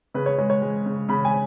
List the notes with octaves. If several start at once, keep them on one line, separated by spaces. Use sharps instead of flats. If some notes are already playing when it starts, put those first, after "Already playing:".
C#3 B4
C#5
G#3 C#5
C#5
G#3
C#3
C#3 B5
G#5